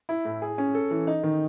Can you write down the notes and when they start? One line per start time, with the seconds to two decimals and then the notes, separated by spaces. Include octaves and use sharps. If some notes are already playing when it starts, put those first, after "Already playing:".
0.09 E4
0.25 A2
0.42 G#4
0.58 C#4
0.75 A4
0.91 E3
1.07 D#4
1.23 D#3